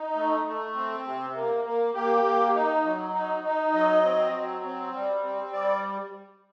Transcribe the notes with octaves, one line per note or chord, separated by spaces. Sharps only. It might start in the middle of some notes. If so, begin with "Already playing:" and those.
Already playing: D#4
A3
A3
C4
C3
A#3
A#3
A#3 G4
A#3
D#4
F#3
D#4
D#4
F#3 D#5
C4
F#3
C4
G3
C4
G3 D5